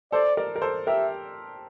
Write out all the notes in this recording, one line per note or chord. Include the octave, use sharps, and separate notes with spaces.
A4 C5 D5
A#4 D5
A#4
A4 C5
G4 A#4 E5